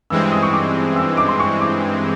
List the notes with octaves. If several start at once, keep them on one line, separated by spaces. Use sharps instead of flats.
G2 E3 G#3 C4 E6
D#6
C#6
D6
E6
D6
C6
C#6
D6